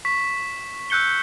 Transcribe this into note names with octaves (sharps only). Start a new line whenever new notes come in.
C#6 B6
E6 F#6 G6 C#7 G7